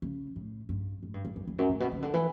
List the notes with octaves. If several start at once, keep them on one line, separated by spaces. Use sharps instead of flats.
C#3
A2
G2
A2
G2
G2
F#2
E2
F#2
A2
B2
C#3
D3
E3